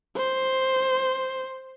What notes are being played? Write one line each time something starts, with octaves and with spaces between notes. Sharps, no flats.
C5